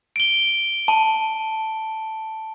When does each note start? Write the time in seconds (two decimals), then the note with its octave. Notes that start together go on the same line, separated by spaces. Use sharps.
0.16 D7 G7
0.88 A5